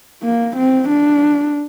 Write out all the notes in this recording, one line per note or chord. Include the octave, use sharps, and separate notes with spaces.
A#3
C4
D4